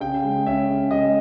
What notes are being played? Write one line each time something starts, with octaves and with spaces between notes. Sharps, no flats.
C#3 G5
G#3
C#4 E5
C#3
G#3 D#5